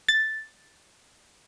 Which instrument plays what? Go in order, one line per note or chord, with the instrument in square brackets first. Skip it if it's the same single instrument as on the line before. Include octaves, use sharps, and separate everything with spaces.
[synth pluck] A6